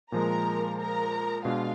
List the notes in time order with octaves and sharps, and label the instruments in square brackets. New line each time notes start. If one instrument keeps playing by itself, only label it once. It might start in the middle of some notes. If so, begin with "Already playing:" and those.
[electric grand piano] A#2 F3 G#3 [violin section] A#4 A#5
[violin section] A#4 A#5
[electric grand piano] B2 G#3 D4 [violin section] F4 F5